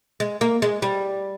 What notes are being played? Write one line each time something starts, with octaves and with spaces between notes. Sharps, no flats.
G#3
A#3
G#3
G3